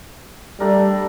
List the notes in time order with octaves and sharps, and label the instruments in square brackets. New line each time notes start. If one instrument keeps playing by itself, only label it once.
[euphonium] G3 [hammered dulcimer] A3 D4 A#4